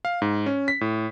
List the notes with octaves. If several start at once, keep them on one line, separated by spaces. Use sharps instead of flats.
F5
G#2
C#4
B6
A2